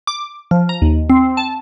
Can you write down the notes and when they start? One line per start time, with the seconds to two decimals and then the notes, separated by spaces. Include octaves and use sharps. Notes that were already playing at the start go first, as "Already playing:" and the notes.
0.07 D6
0.51 F3
0.69 A#5
0.82 D#2
1.10 C4
1.37 A5